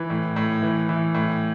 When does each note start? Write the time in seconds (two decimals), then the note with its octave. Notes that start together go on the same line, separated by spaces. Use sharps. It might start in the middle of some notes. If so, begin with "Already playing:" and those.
Already playing: E3
0.10 A2
0.36 A2
0.62 E3
0.89 E3
1.14 A2